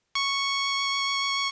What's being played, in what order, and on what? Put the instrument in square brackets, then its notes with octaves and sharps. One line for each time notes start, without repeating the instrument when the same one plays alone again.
[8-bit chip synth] C#6